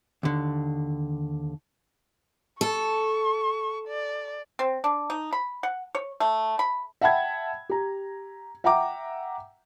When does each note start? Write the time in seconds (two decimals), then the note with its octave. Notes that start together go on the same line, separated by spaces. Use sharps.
0.23 D#2 D3
2.61 A4 C#6
3.88 D5
4.59 C4
4.84 D4
5.10 D#4
5.33 B5
5.63 F#5
5.95 C#5
6.20 A3
6.59 B5
7.01 E5 F#5 G5 A5 B5 G#6
7.69 G4 A#5
8.64 E5 F#5 G5 A#5 D6